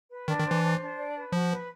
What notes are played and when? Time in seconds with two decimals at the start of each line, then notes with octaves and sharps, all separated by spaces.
0.10 B4
0.28 D#3 D4
0.39 D#3
0.45 C5
0.51 E3
0.62 C5
0.81 D4
0.98 D5
1.15 B4
1.32 F3 F#4
1.50 B4